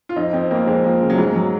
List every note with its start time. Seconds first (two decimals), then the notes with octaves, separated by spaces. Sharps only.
0.09 F4
0.16 F2 D#4
0.33 F2 C4
0.51 F2 A#3
0.67 F2 G#3
0.84 F3 A#3
1.02 C#3
1.10 F#3
1.18 G#2 G#3
1.36 F#3